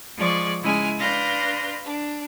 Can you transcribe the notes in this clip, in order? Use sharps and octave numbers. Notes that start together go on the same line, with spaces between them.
F3 G#3 G#4 D5 C#6
C#3 G#3 E4 G#5 F6
D4 B4 F5 C6 G6 A#6
D4